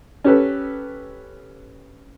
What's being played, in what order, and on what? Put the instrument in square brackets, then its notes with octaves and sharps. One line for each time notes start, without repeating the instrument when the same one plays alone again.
[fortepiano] C#4 G4 A4 B4